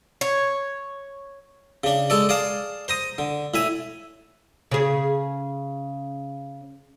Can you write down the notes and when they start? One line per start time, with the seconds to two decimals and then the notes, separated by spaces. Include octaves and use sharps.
0.21 C#5
1.84 C#3 D4
2.10 G#3 A4 D5
2.29 G#4 D5 F5 A5
2.88 C5 A#5 D#6
3.18 D3
3.54 A2 E5 G#5
4.71 C#3 G#4